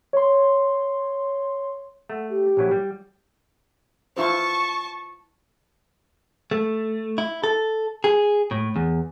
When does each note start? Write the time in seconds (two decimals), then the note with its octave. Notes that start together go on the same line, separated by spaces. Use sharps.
0.13 C#5 C6
2.10 A3 F#5
2.29 G4
2.57 A#1 F#3 E4
2.71 G3
4.17 E4 F4 C5 A5 C#6
6.51 A3
7.18 E4
7.44 A4
8.04 G#4
8.51 A2
8.76 E2